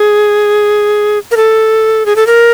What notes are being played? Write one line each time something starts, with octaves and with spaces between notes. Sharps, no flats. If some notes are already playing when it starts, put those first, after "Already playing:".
Already playing: G#4
A#4
A4
G#4
A4
A#4